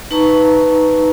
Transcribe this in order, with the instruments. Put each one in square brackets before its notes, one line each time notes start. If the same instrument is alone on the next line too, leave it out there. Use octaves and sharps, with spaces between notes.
[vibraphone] D#4 B4 A5 A#5 C#6